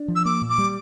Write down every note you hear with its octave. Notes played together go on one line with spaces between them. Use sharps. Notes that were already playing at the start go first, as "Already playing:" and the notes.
Already playing: D4
F3
E6
A#3 D6
A#2
D6
G3